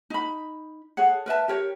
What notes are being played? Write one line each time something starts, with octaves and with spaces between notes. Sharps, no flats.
D#4 B5
G#4 A4 C#5 F#5
A#4 B4 E5 A5
G4 A#4 C#5